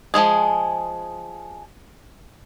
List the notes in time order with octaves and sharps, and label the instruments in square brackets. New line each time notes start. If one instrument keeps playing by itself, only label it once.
[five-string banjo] F3 F#3 G#3 G#4